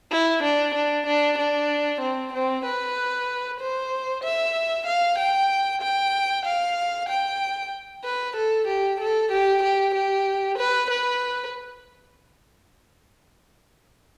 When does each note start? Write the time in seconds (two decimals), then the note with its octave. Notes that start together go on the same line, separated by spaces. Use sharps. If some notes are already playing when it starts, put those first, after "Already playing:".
0.11 E4
0.43 D4
0.75 D4
1.06 D4
1.38 D4
2.01 C4
2.33 C4
2.65 B4
3.60 C5
4.24 E5
4.87 F5
5.18 G5
5.82 G5
6.46 F5
7.09 G5
8.04 B4
8.37 A4
8.67 G4
9.00 A4
9.32 G4
9.63 G4
9.95 G4
10.58 B4
10.90 B4